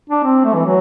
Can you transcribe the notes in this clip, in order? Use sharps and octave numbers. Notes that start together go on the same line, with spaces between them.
D4
C4
A3
E3
F#3